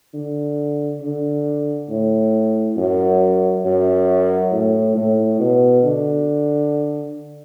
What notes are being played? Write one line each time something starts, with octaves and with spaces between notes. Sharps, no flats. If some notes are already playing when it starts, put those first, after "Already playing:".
D3
D3
A2
F#2
F#2
A2
A2
B2
D3